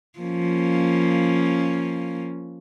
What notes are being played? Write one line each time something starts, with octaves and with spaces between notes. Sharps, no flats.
F3 A#3 C#4